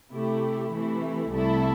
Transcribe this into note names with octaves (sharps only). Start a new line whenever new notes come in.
C3 A3 E4 G4
C3 E3 A3 E4
C2 C3 A3 E4 A4